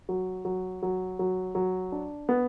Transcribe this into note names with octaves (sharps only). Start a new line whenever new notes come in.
F#3
F#3
F#3
F#3
F#3
D4
B3